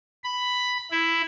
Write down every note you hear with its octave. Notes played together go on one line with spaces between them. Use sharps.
B5
E4